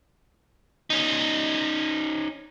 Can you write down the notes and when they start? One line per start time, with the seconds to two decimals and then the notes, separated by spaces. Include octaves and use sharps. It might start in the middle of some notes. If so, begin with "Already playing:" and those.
0.90 C#4 D#4